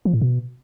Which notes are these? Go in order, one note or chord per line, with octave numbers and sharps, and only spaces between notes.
F3
A2
B2